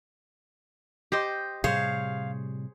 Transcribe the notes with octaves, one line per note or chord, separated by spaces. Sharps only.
G4 C5 D#5
A2 C3 G3 G#4 C5 C#5 F5